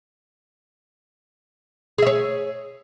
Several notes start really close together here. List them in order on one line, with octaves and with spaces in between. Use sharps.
G#4 E5 C#5